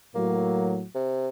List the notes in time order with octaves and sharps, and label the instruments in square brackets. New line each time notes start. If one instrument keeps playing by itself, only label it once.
[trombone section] A2 F#3 [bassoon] A#3
[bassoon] C3